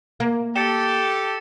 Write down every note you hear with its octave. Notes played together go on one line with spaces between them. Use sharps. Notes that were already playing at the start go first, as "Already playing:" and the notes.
A#3
G4 A4 A6 C#7 E7